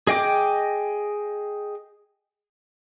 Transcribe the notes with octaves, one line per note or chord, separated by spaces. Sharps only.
G#4 D#5 G5 D6